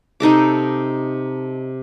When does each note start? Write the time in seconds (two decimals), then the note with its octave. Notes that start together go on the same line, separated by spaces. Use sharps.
0.20 C3 D#4 A4 D6